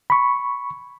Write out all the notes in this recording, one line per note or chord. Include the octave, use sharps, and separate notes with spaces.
B5 C#6